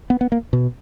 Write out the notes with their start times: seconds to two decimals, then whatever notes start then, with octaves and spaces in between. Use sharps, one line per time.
0.10 B3
0.21 B3
0.32 A#3
0.53 B2